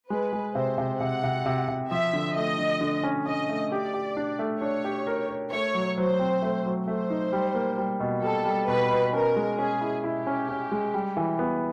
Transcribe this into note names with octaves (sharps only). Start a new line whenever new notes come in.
G#3 B4
G#3
C3 C5
C3
C3 F#5
C3
C3
C3
F3 E5
D3
A3 D#5
D3
D3
C#4
C#4 D#5
A3
G4 D5
G4
D4
A3
D4 C#5
G4
A#4
A#4
A3 C#5
F#3
F#3 C5
C4
A3
F#3
A3 C5
D#4
G3
A#3
G3
B2
G3 A4
G3
B2 B4
B2
C#4 A#4
G#3
C#4 G#4
E4
E4 G4
C#4
C#4
G#3
G3
E3
B3